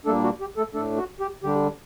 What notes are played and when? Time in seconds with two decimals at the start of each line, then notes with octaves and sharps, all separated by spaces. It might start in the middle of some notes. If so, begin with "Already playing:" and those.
0.05 A#2 G3 A3 A#3 D4 A4
0.24 F#4
0.41 G4
0.57 A3 A4
0.74 A2 A3 D4 A4
0.97 F#4
1.20 G4
1.44 D3 G3 D4 G4